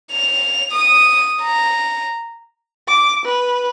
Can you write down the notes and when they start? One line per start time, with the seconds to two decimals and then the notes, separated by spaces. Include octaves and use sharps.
0.12 F7
0.72 D#6
1.41 A#5
2.88 D6
3.25 B4